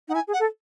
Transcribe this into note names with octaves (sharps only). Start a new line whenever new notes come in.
D#4 F#5
E4 G#5
G#4
F#5
A4